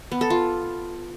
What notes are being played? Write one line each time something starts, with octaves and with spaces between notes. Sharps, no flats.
B3
A4
F4